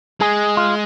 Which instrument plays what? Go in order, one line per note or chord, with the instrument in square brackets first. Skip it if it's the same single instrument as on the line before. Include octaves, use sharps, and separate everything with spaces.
[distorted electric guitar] G#3 [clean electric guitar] G#4
[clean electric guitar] F4